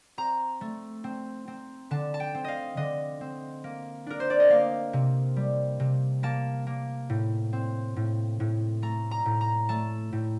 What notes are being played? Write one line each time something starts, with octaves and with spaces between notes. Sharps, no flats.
C4 A#5
A3
C4
C4
D3 A5
A5
G5
C4
D#5 F5
D3 D#5
C4
A#3
D4 A#4
C5
D5
D#5
A#3 F5
C3
G3
C3
A#3 A5
A#3
A2
C4
A2
A2
A3 A#5
A#5
A2
A#5
A3 A5
A2